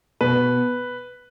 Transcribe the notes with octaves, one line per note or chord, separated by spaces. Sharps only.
B2 B4